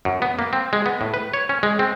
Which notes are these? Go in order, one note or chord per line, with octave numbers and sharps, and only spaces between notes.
F#2
B3
A#3
C4
G#3
B3
A2
B4
C#5
C#4
G#3
C4